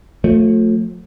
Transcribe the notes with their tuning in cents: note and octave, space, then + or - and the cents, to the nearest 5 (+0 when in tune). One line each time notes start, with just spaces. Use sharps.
F3 +40 A3 +10